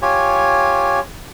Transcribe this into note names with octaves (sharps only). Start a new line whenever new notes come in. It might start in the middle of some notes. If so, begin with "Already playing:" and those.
F4 G4 C#5 G#5